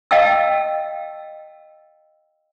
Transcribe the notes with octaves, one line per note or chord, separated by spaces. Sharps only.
D#5 F5 G5 A5 E6